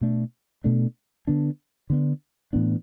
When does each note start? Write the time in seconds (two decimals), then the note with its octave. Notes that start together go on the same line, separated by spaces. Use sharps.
0.01 B2 A3 D4
0.64 B2 A3 D4
1.27 D3 B3 D4
1.90 D3 B3 D4
2.53 A2 E3 B3 D4